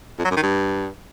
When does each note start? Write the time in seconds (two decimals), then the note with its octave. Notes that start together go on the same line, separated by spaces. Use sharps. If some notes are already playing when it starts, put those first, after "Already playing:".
0.19 F2
0.25 F#3
0.31 F#2
0.37 D#3
0.43 G2